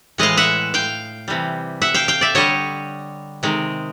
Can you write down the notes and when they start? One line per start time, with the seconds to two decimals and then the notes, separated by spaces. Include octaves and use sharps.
0.18 A2 E3 G#3 D#5 F5
0.37 E5 F#5
0.74 F5 G5
1.28 C3 E3 G3
1.82 E5 F#5
1.94 F5 G5
2.08 F5 G5
2.21 D5 E5
2.35 D3 G3 C#5 D#5
3.43 C3 D#3 G#3